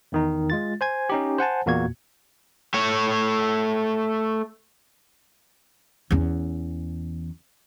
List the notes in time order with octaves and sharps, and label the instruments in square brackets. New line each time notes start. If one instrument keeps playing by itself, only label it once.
[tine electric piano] E2 D#3 D#4
G#3 F4 A6
C5 G#5 G#6
C#4 D#4 G4
C5 F#5 G#5 A5
E2 A#2 A#3 F#4 G#6
[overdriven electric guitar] A3 C#5
[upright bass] E2 C#4